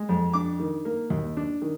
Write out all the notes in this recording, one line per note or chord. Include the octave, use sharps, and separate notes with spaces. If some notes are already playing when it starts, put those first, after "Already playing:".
Already playing: G#3
F2
D4 D6
D#3
A#3
D#2
D4
D#3